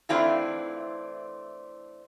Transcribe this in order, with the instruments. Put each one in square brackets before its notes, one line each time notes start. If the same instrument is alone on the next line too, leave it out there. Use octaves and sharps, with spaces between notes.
[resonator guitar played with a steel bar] E3 A3 C4 D4 E4 F4